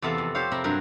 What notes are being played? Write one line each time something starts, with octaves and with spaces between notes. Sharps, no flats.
E2 C3 B3 A4 E5 F5
F2
G4 C5 C#5 F5
C3 A#4 B5
G2 F#3 A#4